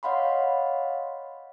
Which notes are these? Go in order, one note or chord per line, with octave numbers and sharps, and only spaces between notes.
C#5 D#5 F5 F#5 B5 C6